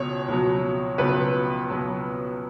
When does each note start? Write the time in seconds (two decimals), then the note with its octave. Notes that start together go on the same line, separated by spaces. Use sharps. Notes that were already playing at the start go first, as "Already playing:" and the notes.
Already playing: C#2 B2 C#5
0.28 C#2 B2 F#3
0.98 C#2 B2 F#3 B4
1.70 C#2 B2 F#3